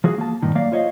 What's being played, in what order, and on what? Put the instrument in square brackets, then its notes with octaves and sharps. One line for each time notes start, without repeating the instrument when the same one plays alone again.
[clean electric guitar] F3 F#4 G#4
A#3 A5
G2 A#2 D#3
F#3 A#3 D5 F5
F4 C5 C#5 D#5 F5